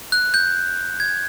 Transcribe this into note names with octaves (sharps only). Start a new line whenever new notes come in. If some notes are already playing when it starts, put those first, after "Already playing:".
F#6
G6
G#6